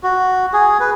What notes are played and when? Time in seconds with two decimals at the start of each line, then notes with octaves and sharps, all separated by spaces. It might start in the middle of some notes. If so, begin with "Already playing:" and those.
0.03 F#4
0.53 G#4
0.80 B4